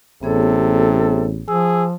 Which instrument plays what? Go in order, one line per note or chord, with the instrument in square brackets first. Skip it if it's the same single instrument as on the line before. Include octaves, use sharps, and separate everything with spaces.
[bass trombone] A1 [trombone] C3 [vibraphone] B3 G#4 C#5 [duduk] A4
[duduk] F3 [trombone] G#4 [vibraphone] E6